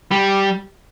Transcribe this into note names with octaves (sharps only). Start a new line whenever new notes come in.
G3